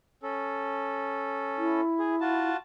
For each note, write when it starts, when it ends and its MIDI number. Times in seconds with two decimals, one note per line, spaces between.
0.23 1.81 61
0.23 1.81 69
1.57 2.51 64
1.99 2.15 68
2.21 2.57 65
2.21 2.57 66
2.21 2.57 81